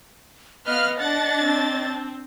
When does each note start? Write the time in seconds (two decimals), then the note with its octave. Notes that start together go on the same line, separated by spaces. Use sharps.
0.66 B3 B4 D#5 F5 F6
1.00 D4 F#5 A6
1.41 C4